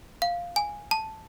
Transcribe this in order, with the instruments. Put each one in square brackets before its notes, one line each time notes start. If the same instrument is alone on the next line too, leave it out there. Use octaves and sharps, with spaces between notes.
[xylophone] F5
G#5
A5